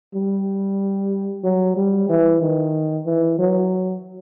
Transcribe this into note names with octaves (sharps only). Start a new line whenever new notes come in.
G3
F#3
G3
E3
D#3
E3
F#3